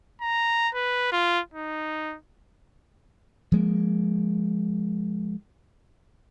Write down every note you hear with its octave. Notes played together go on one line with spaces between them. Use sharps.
A#5
B4
F4
D#4
F3 G#3 A#3